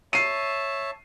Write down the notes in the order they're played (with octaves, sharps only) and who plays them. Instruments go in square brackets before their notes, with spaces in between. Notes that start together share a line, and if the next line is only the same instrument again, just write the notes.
[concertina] C#5 E5 A5 [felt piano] C7 D#7